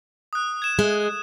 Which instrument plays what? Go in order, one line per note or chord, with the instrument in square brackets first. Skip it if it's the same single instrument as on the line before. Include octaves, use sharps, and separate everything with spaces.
[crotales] D#6 F#6
G#6 E7
[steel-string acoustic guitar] G#3